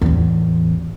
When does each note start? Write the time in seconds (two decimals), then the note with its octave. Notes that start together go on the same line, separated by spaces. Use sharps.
0.01 A1 E2